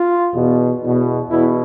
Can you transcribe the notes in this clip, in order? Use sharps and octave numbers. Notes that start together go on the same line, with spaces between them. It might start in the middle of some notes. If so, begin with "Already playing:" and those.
Already playing: F4
E2 B2
E2 B2
E2 B2 E4